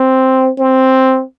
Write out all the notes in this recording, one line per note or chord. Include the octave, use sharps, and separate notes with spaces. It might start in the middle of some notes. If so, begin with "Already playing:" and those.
Already playing: C4
C4